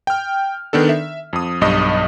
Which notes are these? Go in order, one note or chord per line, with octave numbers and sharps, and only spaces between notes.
G5 F6
D#3 B3 D4 A4
E5
F2 D#6
B1 G2 D#5 D#6